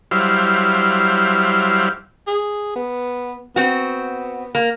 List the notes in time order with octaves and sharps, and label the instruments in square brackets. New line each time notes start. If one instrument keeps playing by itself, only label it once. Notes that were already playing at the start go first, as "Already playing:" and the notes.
[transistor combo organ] F#3 G3 E4 C5 F5
[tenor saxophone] G#4
B3
[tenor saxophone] B3 [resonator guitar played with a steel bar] C4 F#4
[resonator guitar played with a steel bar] A#3